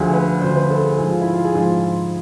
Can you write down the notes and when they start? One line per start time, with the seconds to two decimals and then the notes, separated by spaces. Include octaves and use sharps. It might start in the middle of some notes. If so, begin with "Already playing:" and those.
Already playing: D2 D3 F3 G#4
0.13 B4
0.41 D2 D3 F3 C5
0.56 B4
0.70 A4
0.84 G#4
0.98 G#2 F3 G#4
1.10 F4
1.21 E4
1.33 F4
1.45 G#4
1.55 G#2 F3 F4